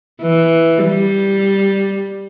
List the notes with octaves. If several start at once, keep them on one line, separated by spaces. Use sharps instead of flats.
E3
G3